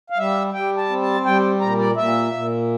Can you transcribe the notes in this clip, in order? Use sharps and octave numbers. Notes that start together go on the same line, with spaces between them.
F5
G3 E5
G3 G5
A5
C4
A5
G3 G5
A#2 A#5
D5
A#2 E5
A#2